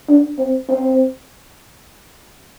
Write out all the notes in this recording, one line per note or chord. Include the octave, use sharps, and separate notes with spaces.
D4
C4
C4